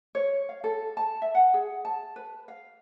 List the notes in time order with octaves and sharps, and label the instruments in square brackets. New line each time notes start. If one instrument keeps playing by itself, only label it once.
[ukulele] C#5
F5
A4
A5
E5
F#5
G#4
A5
B4
F5